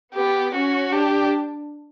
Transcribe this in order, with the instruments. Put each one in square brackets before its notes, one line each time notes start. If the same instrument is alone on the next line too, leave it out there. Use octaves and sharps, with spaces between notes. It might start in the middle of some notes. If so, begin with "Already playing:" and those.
[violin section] B3 [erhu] G4
[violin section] C#4 [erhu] F#4
[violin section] D4 [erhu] G4